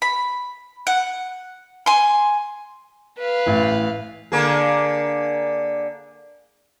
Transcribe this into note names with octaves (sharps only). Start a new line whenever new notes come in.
B5
F#5
G#5 C6
B4 F5
A1 E3
D3 A#3 G#4